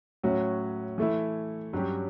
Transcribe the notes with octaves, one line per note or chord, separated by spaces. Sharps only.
A2 F#3 C#4 F#4
E3 A3 E4
G2 F#3 C#4 G4